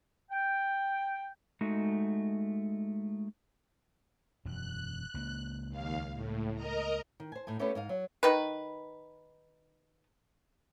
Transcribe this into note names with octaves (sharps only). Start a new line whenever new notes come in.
G5
G#3 A3 D#4 F#4
E1 F#2 F#6
C#2 A#3
D#2 F5
A2
A#4 D#5 A#5
D#3
C5 G#5
A2 D#4 G#5
A3 B3 C#4 G4 A4 B4
G#2 D#5 F5
F#3
D#3 B4